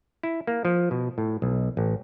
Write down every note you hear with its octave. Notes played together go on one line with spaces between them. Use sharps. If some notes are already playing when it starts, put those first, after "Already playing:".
E4
A#3
F3
B2
A2
B1
A1